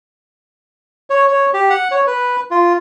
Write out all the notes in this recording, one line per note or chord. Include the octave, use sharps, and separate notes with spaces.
C#5
C#5
G4
F#5
C#5
B4
F4